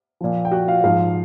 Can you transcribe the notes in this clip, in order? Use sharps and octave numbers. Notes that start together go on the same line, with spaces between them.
A#2 F3
G5
F#4 F#5
F4 F5
G#2 F3 F4 F5